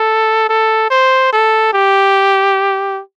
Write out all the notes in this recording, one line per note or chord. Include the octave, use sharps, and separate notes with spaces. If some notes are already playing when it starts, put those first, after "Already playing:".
Already playing: A4
A4
C5
A4
G4